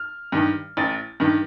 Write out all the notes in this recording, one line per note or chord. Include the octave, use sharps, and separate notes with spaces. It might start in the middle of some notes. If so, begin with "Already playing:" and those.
Already playing: F6
G2 D#3
A1 A6
G2 D#3